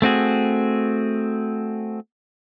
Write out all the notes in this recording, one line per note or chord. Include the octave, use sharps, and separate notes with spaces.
A3 C4 F#4 G#4